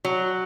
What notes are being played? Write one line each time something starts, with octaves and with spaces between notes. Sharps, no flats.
F#3